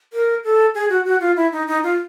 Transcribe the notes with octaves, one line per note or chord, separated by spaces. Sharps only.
A#4
A4
G#4
F#4
F#4
F4
E4
D#4
D#4
F4